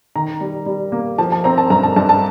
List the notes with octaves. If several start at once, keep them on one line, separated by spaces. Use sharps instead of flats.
D#3 A#5
G3
G3
A#3
F3 A5
A5
C4 A#5
A5
G2 A#5
A5
G2 A5
A5